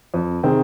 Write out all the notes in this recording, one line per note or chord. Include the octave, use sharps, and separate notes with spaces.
F2
C3 D#3 C4 G#4